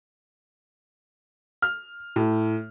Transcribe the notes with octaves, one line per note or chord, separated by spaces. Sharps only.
F6
A2